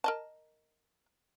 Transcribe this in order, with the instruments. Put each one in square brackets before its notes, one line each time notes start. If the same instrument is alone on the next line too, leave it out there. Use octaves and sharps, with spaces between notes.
[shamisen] A#4 D#5 A5